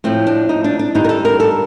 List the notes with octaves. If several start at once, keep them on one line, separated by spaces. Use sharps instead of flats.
A2 F3 C4
D4
D#4
D4
D4
G2 D#3 G3 D#4
A#4
A4
A#4
A4